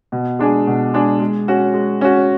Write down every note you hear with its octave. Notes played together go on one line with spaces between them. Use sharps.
B2
G#3 D4 G#4
B2
G#3 D4 G#4
G#3
C#4 F#4
G#3
C#4 F#4